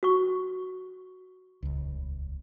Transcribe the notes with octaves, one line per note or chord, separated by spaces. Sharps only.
F#4 C#6
D#1 C#2